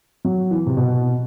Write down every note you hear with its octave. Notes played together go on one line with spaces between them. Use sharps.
F#3
E3
C3
B2